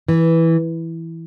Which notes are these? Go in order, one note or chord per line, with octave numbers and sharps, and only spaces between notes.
E3